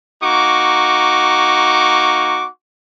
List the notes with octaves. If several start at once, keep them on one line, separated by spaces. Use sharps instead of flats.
A#3 D#4 F#4 C#6 D6